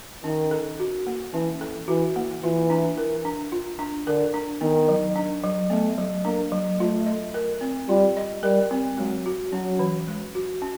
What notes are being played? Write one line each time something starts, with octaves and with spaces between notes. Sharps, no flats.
D#3 C#4
A4
F#4
A#3
E3 C#4
A4
E3 F#4
A#3
E3 F4
D4
A#4
D4
F4
D4
D3 A#4
D4
D#3 B3
F#3
D4
F#3
A3 B3
F#3
A#3 D4
F#3
A3 F4
D#5
A#4
C4
G3 F4
D#5
G3 A#4
C4
F#3 G#3
F#4
F#3 C#4
E3
G#3
F#4
C#4